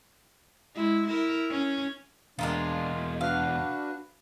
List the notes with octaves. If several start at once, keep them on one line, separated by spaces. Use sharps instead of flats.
G#3 E4
E4 A#4
C#4
E2 B2 G#3 A#3 D4 F4
D4 F#4 B4 F5